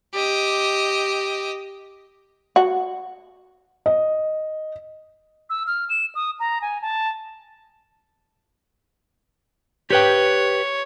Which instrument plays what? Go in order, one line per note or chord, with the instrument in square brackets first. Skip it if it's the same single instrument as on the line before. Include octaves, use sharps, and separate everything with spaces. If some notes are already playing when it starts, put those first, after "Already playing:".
[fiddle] G4 D#5
[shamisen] F#4
[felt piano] D#5
[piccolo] E6
F6
E7
D#6
A#5
G#5
A5
[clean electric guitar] G4 B4 G5 [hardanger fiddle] C#5